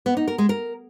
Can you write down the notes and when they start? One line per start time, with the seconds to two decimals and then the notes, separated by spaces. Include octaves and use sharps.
0.06 B3
0.17 D#4
0.28 A#4
0.38 G#3
0.49 A#4